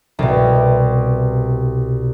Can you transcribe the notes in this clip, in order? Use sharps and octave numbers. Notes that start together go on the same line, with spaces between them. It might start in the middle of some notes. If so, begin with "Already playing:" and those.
C2 B2